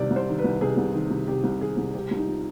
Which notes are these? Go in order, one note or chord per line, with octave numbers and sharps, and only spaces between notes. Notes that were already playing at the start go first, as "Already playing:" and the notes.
Already playing: C2 C3 D#3 D5
C2
C5
D#3
B4
C2
C3 G#4
C2
D#3
C2
C3 G4
C2
D#3 G#4
C2
C3 G4
C2
D#4
F3